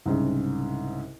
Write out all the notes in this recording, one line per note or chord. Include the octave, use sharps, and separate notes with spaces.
C2 G#2 C#3